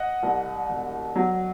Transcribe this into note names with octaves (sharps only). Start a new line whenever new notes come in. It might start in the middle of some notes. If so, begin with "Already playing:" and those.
Already playing: D#5 F#5
C2
E1
F#3